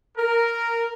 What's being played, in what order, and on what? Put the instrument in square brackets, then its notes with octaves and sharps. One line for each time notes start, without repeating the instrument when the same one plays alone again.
[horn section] A#4